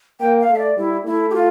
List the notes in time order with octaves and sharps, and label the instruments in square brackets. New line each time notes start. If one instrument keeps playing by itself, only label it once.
[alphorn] A#3 [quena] G5
[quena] F5
[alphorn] A3 [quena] E5
[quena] D5
[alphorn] G3 [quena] E4
[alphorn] A3 [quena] E4
[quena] G4
F4